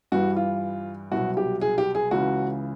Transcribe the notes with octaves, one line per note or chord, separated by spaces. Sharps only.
G2 E3 G3 F#4
F4
C2 B2 F#3 F#4
G4
G#4
G4
G#4
C#2 C#3 E3 F#4